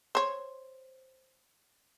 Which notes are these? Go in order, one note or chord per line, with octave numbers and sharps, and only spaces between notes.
C5 C#5